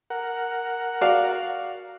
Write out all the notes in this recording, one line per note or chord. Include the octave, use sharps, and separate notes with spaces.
A#4 F#5
F#4 D5 F5